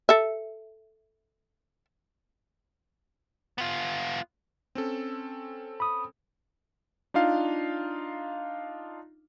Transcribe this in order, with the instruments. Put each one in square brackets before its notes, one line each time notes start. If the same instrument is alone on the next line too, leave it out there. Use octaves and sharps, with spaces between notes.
[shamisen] A4 E5
[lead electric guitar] B3 F4
[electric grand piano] C4 C#4 A4
[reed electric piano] B5 D#6
[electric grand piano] D4 D#4 F4 F5